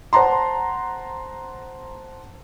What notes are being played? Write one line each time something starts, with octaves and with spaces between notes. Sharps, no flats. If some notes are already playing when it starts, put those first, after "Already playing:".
C5 F#5 A5 A#5 C6